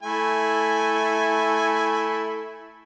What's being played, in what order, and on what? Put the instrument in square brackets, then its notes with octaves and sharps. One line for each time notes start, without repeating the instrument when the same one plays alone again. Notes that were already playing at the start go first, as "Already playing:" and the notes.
[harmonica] A3 E4 G#5